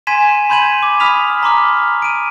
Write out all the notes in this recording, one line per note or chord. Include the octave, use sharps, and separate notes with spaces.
G#5 C6 G#6 B6 D#7 E7
B5 C6 G6 G#6 D#7 F#7
D6
B5 D#6 F6 B6 F7
A#5 C6 D6 F6
D7 D#7